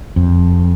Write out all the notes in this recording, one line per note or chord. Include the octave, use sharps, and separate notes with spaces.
F2